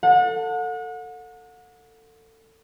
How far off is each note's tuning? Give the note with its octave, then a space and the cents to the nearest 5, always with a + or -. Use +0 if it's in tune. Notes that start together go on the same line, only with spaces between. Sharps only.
A4 +25 F#5 -35